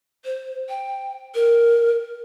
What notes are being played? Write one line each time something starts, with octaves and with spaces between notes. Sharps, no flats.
C5
G5
A#4